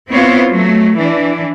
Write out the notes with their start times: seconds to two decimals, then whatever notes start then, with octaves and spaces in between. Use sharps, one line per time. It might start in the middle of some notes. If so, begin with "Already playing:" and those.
0.11 B3 C4 E4 F4 C5 C#5
0.51 F#3 A3
0.97 E3 D4